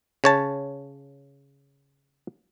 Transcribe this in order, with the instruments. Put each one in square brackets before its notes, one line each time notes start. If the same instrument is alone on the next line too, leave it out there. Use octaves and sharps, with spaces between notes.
[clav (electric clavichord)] C#3 C#5 A5